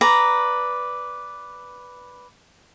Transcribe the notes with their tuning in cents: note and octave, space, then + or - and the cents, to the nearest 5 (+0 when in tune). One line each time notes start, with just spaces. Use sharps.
B4 +0 D5 -5 A#5 +0